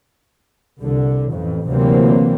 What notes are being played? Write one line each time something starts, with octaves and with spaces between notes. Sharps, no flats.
C2 D3
A1 F2
D2 C3 E3 F#3 A#3 C4